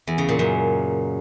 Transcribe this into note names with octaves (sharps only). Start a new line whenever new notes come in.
E2
C#3
A#2
F#2